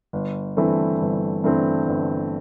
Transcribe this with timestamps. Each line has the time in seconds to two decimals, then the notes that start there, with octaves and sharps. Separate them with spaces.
0.13 G1
0.57 G2 E3 A3 C4
1.01 G1
1.44 G2 E3 A3 C4
1.88 G1